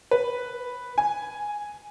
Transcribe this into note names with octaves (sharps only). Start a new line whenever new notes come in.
B4
G#5